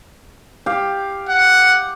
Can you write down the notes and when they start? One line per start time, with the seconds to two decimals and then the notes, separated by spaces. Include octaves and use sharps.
0.66 G4 F5
1.29 F#5